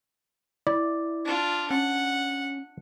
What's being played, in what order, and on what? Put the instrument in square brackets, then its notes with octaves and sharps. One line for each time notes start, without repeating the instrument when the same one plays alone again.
[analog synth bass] E4 [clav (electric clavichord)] D5
[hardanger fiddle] D4 F4
[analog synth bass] C#4 [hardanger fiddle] F#5